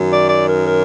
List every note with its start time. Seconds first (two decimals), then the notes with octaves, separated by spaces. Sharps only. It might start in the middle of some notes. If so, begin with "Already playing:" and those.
Already playing: F#2 D#3 F#3
0.10 D5
0.28 D5
0.47 A#4
0.65 A#4